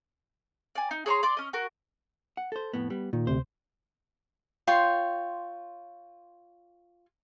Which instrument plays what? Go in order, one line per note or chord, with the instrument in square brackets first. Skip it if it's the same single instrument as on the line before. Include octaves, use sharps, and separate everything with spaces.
[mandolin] D5 G#5
D#4
G#4 C#5 A#5 C6
D5 C6 D6
C#4 D#5
F#4 A#4
[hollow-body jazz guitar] F#5
A4 C5
F2 A2 B3
G3 B3
[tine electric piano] A#2 [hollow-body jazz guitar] D#3
[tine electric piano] D2 C3 [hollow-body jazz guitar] C5
[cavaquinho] F4 C#5 G5 C6